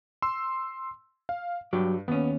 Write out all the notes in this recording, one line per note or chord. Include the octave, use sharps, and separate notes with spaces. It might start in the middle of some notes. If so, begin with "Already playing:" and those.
C6 E6
F5
G2 F#3 G4
D#2 B3 C#4